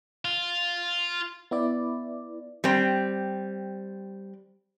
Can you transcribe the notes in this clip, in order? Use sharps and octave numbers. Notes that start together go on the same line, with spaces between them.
F4
B3 E4 D5
G3 C4